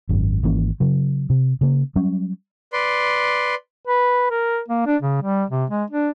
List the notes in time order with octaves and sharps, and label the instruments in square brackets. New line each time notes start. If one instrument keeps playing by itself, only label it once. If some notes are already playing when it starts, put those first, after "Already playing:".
[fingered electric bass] G#1 F#2
G#1 E3 A#3 C#4
C#3 F#3
C3
C#3 A#3
F#3 G3 C#4
[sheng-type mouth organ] B4 D5 C6
[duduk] B4
A#4
A#3
D4
C#3
G3
C3
G#3
D4